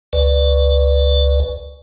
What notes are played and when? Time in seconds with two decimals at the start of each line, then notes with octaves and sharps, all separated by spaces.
0.13 C#2 B4 D5